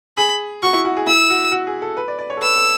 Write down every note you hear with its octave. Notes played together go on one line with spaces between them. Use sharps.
G#4 B5
F#4 C#6
E4
F#4
G#4
E4 E6
F#4
F#4
G#4
A4
B4
D5
D5
C#5
A4
B4 E6
A4